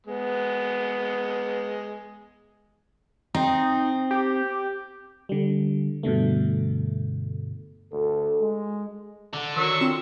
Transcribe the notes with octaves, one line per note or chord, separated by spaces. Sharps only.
G#3 B3
C4 D#4
G4
D3 G3
G2 B2 D3 A3
D2 A4
G#3
D3
D#3 F#3 C#6 E6
C4 F4 E7